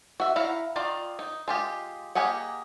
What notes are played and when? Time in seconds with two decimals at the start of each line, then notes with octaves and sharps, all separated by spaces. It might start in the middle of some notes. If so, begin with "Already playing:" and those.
0.20 F#4 E5
0.36 E4 F5 F#5 A#5
0.76 D#3 F4 D5 A#5
1.19 D#4
1.48 G#3 F4 G4
2.15 A#3 G4 G#4 D#5 F#5